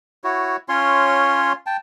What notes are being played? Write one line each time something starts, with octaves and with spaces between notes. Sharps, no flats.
E4 F#4 C#5
C#4 F4 C#5 C6
G5 A5